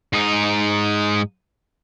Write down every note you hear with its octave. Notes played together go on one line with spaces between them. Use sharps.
G#2 D#4